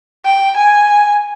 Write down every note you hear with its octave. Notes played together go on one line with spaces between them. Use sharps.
G5
G#5